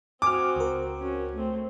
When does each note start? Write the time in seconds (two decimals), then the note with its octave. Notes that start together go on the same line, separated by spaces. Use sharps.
0.22 C4 F#4 G#5 D6 D#6 F6
0.56 C#2 A#4
1.01 C#4 F#4
1.34 A3 C4